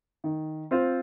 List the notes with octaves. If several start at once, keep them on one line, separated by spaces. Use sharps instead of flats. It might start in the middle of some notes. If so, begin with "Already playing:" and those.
D#3
C4 F4 C5